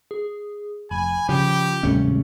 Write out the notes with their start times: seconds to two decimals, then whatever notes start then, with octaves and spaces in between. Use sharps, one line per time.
0.11 G#4
0.91 F1 G#5 B5
1.29 C#3 F3 G4
1.83 D1 G#1 C3 G3 A3 C#4